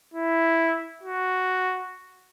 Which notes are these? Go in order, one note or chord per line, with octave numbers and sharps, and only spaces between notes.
E4
F#4